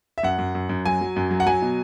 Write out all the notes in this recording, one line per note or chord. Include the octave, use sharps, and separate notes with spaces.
E5
F#2 F#5
F#2
F#2
F#2
F#3 G#5
F#3
F#2
F#3
F#5
F#3 G#5
B2